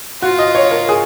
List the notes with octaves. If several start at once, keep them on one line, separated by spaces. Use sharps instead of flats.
F4 F#4
D#5
C#5
A#4
G#4